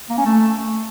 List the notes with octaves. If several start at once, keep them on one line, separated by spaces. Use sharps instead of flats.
A#3
C#4
A3